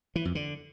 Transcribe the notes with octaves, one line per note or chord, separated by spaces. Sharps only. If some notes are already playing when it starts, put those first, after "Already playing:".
E3
F2
D3